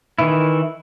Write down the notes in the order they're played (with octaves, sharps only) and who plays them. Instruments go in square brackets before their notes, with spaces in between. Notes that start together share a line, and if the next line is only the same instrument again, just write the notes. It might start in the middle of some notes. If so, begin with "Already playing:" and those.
[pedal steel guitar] D#3 E3 E4